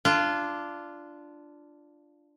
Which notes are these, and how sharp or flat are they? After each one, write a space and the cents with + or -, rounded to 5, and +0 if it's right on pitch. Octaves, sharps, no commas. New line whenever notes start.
D4 +0 F4 -20